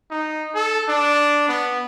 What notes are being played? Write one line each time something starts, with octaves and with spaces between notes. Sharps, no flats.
D#4
A4
D4
B3